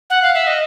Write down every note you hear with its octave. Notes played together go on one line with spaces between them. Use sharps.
F#5
F5
E5
D#5